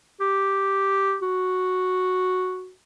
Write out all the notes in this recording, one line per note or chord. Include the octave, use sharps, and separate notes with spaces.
G4
F#4